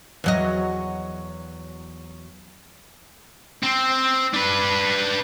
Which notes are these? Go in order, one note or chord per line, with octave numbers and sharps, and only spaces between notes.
E2 F#3 D#5
C4
D4 B4